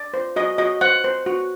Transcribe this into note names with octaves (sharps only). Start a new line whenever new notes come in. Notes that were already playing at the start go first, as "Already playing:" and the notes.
Already playing: D5
C5
F#4 D#5
F#4 D#5
C5 F#5
C5
F#4